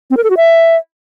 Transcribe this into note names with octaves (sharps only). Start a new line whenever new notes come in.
C4
A#4
A4
F#4
E5